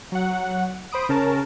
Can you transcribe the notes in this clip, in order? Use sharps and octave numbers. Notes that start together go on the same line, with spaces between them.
F#3 F#5
C5 B5 D#6 D7
C#3 C#4 A#4 A5